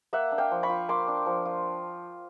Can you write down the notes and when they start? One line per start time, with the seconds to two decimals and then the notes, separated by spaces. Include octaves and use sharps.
0.13 A#3 E5 F#5
0.32 D4
0.38 F5 G5
0.51 F3
0.63 B5 C#6
0.69 F4
0.89 A#3 C6 D6
1.08 D4
1.26 F3
1.45 F4